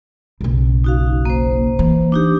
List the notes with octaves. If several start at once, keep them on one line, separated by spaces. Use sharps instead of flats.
F#1 B1
D#4 F#4 F5
A#3 C5
E3
D4 D#4 G4